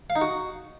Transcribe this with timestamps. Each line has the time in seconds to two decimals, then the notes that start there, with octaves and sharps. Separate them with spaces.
0.10 F5
0.16 D#4
0.21 F#4